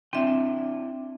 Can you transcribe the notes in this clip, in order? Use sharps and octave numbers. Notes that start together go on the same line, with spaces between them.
C4 D4 E4 E5 G5